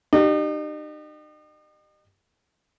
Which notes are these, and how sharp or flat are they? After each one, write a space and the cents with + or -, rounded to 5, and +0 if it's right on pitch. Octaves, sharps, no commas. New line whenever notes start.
D#4 -40 G4 -20